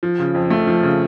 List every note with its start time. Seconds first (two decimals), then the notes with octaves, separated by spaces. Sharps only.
0.03 F3
0.19 C#3
0.35 F2
0.51 A3
0.67 F3
0.83 C#3